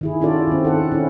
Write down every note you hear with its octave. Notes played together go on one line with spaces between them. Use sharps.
D#3 E4 G#4
C#4 F4 F#4 A4 D5
D#3 C4
A4 F#5
C#4 E4